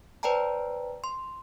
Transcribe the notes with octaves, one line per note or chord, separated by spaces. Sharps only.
B4 C5 D5 G5 A5 A#5
C6